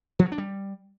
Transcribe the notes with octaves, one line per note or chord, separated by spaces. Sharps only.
F3
F#3
D4
G3